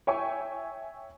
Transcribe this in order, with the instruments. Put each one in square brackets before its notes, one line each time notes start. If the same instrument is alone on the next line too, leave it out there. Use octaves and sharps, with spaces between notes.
[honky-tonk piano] C#5 E5 G5 G#5 C#6